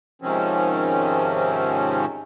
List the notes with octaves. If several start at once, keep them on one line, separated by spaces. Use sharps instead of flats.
G#2 C3 D#3 F3 C4 C#4